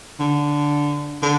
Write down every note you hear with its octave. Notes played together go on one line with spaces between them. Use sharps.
D3
D3